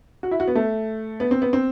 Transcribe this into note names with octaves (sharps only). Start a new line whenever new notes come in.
F#4
E4
F#4
B3
A3
B3
C4
B3
C4